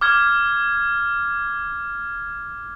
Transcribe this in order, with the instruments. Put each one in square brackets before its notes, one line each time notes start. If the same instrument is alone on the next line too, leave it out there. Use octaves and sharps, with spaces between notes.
[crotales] D6 F6 G#6